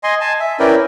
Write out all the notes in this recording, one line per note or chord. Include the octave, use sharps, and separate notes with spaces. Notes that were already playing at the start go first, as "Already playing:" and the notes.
D#5 G#5 C6
G#5 A5
E5
C#4 E4 A#4 B4 D5 G5